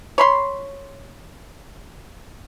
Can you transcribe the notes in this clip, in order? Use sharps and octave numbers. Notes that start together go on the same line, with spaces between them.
C#5 B5 C6